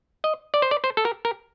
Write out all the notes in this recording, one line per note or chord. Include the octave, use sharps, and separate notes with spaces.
D#5
D5
C5
D5
C5
A4
A#4
A#4